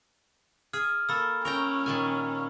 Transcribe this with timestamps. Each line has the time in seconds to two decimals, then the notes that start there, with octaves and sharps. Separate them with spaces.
0.73 G#4 F6
1.09 A#3 A4 B5 E6
1.45 C#4 A#4 G5 A#5 C#6 F7
1.86 A#2 D#3 G#5